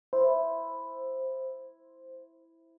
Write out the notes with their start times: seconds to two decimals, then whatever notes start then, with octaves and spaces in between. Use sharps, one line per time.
0.13 E4 C5